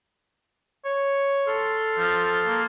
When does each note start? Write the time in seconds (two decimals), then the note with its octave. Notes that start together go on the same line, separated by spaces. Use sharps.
0.85 C#5
1.47 A4 C6 F6
1.98 F3
2.47 A#3